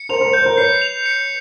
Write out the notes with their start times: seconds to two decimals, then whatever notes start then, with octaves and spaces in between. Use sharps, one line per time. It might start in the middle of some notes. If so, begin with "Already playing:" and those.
Already playing: C#7
0.09 A#4 C5 F7
0.21 A#4 C5
0.33 A#4 C5 G6
0.45 A#4 C5
0.58 B4 C#5 C7
0.82 F7
1.06 C#7